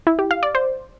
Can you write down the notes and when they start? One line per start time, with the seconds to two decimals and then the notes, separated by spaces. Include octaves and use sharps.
0.07 E4
0.19 G4
0.31 F5
0.43 D5
0.55 C5